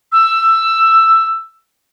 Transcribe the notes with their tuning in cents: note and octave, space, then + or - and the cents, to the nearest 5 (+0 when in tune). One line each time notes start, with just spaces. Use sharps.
E6 +10